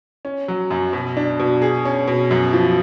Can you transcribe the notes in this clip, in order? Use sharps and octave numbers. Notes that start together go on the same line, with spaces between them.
C#4
F#3
F#2
B2
D4
B2
G#4
C#4
B2
F#2
F3